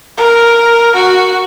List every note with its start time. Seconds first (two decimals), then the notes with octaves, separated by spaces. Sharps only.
0.17 A#4
0.95 F#4